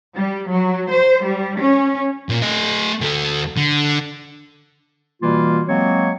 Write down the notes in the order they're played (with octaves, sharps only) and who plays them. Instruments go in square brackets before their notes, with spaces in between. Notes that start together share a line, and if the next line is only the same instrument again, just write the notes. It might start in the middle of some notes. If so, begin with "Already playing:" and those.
[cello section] G3
F#3
C5
G3
C#4
[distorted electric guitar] A#2
A3 D#5
D2 A4
D3
[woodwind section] B2 E3 G3 A#3 F4
F#3 G#3 A#3 C4 C#5